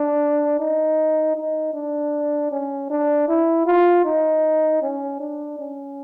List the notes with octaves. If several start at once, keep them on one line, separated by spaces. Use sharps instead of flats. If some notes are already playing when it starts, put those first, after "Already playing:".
Already playing: D4
D#4
D#4
D4
C#4
D4
E4
F4
D#4
C#4
D4
C#4